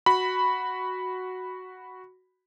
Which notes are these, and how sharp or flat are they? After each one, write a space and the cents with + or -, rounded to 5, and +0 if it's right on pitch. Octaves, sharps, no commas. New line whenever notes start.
F#4 +0 B5 +0